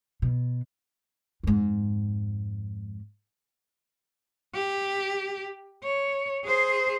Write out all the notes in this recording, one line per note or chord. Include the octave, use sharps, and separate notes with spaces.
B2
F2 G#2
G4
C#5
G#4 C5